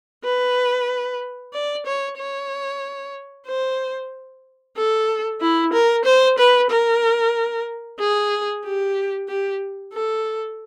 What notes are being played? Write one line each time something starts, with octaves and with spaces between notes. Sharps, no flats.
B4
D5
C#5
C#5
C5
A4
E4
A#4
C5
B4
A#4
G#4
G4
G4
A4